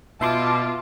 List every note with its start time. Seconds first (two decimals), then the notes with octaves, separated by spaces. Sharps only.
0.21 B2 F4 E5 A5 C6 D6